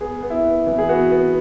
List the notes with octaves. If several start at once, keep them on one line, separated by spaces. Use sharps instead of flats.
B3 G#4
B3
E4
B3
E3
G#4
B3 F#4
B3